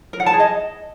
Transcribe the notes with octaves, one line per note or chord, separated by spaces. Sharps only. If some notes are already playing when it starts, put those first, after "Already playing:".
A#4
F#5
A5
G#4
D#5